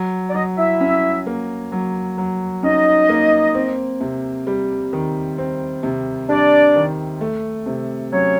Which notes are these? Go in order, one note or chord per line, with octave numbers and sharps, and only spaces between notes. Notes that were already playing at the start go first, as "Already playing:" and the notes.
Already playing: F#3
D5
F#3 D#4 D#5
E4 E5
C#4
A#3
F#3
F#3
C#4 D#4 D#5
A#3
C4
C3
G3
D#3
C4
C3
G3 D4 D5
D#3
A3
C3
F#3 C#4 C#5